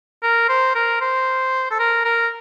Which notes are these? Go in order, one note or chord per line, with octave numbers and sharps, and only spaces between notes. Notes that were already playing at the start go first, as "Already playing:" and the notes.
A#4
C5
A#4
C5
A4
A#4
A#4